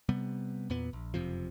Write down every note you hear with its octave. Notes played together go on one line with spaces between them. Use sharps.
C3 G3 B3
E2 A#2 B3
A#1
F#1 F2 C3 F3